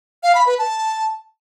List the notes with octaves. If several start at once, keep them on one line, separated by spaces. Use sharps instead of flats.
F5
B5
B4
A5